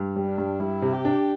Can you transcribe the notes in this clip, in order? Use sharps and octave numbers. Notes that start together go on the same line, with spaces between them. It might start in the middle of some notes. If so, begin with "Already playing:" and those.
Already playing: G2
G3
D4
G2
G3 E4
C3
G4
D4